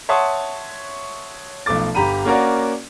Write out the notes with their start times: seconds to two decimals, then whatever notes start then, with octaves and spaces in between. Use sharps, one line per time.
0.09 C#5 E5 F#5 A5 C6 D#6
1.66 B1 F3 A3 D6 A6
1.95 G1 G4 A#5 B5 D#7
2.25 A#3 C#4 F#4 A#4 D5